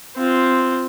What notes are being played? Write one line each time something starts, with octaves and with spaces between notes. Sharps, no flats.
C4 F4